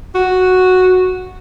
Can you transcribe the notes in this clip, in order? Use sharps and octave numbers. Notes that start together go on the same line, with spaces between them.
F#4